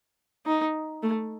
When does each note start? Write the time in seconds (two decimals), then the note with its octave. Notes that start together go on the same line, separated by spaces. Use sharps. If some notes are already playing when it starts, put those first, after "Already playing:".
0.46 D#4
1.03 A3